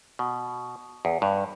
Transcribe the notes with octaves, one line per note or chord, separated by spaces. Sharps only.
B2
E2
G2